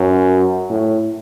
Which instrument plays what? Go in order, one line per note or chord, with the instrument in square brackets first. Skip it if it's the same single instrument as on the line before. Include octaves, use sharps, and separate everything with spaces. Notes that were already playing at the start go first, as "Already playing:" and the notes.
Already playing: [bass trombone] F#2
A2